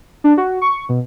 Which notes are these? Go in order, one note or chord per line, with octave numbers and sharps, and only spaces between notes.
D4
F#4
C#6
B2